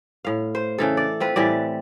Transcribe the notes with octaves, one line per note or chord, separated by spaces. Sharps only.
A2 F5
C5
C#3 E3 A4
D5
C4 F4 B4
A2 E3 G3 D5